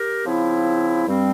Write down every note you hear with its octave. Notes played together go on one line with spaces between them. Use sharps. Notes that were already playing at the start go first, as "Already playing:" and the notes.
Already playing: G4 A#4
C#3 F3 C4 E4
G2 G3 C4